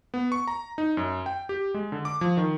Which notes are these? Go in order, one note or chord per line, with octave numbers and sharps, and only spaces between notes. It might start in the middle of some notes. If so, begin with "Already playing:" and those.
B3
C#6
A#5
D#4
F#2
G5
G4
G#3
D3
D6
F3
D#3